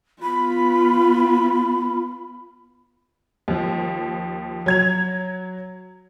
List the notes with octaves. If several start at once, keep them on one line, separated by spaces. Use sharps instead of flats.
B3 F4 B5
D#2 F3
F#3 G#6 F7